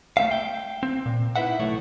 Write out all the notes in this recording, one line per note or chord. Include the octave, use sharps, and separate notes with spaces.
A3 C4 E5 F5
G5
C4
A#2
D#4 E4 F#4 B4 E5 F#5
B1 A2 E3 A3 C#5